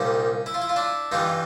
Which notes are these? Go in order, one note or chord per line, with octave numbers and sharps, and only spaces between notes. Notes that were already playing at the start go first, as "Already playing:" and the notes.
Already playing: C2 A#2 G3 C#4 D#4
E4
F4
E4
F4
D4 E4
G2 E3 G3 D#4 F4